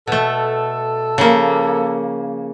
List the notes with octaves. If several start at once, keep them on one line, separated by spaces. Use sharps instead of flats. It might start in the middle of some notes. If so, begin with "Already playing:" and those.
B2 A3 A4
C#3 F3 A#3